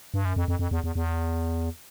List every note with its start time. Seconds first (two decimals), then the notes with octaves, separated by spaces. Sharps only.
0.14 G2
0.25 F#2
0.36 F2
0.48 F2
0.59 F2
0.71 E2
0.84 E2
0.96 E2